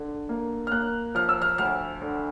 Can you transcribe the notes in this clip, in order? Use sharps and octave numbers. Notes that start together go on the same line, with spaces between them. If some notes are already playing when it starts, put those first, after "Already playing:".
Already playing: D3
A#3
F6
A#3 F#6
F3 F6
E6
F6
D2 F6
D3